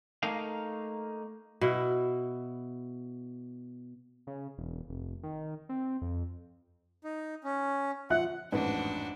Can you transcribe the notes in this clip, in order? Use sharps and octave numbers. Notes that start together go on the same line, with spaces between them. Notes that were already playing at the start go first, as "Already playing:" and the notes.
A3 A#3 D#4 F5
B2 E4
C#3
E1
F1
D#3
C4
F2
D#4
C#4
F3 E5 F#5 F#6
A1 F2 G#2 D4 F#4 B4